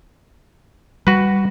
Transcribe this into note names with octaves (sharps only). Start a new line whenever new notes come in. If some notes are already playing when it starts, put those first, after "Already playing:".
G3 F#4 B4